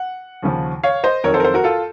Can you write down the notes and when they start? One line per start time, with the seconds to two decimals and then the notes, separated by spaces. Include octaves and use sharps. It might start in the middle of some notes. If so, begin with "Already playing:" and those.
Already playing: F#5
0.43 D#2 C#3 F3
0.83 C#5 F5
1.04 C5 D#5
1.24 F2 D#3 F#3 A#4 C#5
1.34 A4 C5
1.40 A#4
1.44 A4 C5
1.54 F#4 A#4
1.64 F4 A4